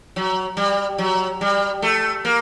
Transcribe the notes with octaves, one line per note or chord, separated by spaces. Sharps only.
F#3
G3
F#3
G3
A3
A#3